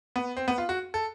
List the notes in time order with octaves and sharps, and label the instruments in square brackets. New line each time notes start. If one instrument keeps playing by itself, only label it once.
[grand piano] B3
C4
B3
F4
F#4
A4